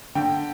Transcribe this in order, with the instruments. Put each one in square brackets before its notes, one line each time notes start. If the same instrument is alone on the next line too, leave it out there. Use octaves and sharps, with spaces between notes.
[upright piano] D3 G5